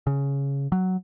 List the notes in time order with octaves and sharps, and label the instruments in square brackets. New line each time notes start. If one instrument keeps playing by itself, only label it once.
[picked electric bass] C#3
F#3